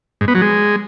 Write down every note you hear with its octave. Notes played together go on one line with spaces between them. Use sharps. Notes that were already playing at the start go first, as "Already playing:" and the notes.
G#2
B3
F#3
G#3